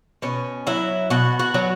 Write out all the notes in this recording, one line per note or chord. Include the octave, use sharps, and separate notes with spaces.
B2 C#4
F#3 E4
B2 F#4
F#4
F#3